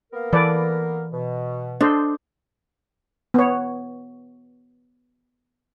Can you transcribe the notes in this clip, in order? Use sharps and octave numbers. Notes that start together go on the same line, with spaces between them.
A#3 B3 A#4
E3 A4 B4 D5
B2
D4 A4 C5 D#5
B3 C#5